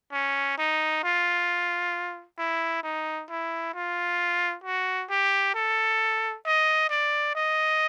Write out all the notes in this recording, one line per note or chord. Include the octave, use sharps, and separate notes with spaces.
C#4
D#4
F4
E4
D#4
E4
F4
F#4
G4
A4
D#5
D5
D#5